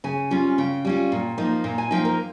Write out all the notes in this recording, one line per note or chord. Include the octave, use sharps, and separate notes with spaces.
C#3 G#5
G3 C#4 F4
C#3 G5
G3 C#4 F4
A#2
F3 A#3 D#4
A#2
G#5
F3 A#3 D#4 G5
A#4